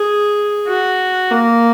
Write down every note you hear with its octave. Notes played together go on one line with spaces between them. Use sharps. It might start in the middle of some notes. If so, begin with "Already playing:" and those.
Already playing: G#4
F#4
A#3